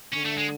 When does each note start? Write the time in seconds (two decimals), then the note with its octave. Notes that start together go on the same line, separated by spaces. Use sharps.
0.13 D3 C#4
0.25 A3
0.38 G#3